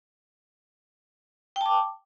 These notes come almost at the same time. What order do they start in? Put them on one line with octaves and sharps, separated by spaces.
G5 A5 D6